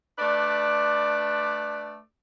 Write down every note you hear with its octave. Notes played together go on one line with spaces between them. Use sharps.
A3 D4 B4 D5